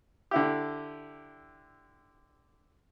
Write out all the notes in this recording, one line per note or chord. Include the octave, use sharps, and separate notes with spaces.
D3 E4 G4